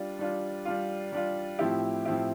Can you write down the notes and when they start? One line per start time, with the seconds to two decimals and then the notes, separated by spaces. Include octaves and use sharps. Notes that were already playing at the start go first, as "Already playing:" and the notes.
Already playing: G3 D4 F4
0.19 G3 D4 F4
0.65 G3 D4 F4
1.12 G3 D4 F4
1.59 A2 F3 C4 E4 G4
2.05 A2 F3 C4 E4 G4